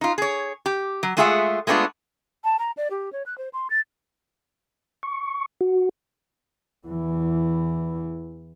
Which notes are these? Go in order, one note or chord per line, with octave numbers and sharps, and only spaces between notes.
D#4 F4
G#4 C#5
G4
F#3
G#3 A3 F4 G#4 E5 F#5
G#3 A3 B3 D4 F4
A5
A#5
D5
G4
C#5
F#6
C5
C6
A6
C#6
F#4
E2 E3